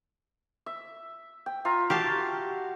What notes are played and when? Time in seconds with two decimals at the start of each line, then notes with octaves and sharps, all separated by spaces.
0.66 E5
1.46 G5
1.65 F4 E5 A#5
1.90 F#4 G4 F5 A5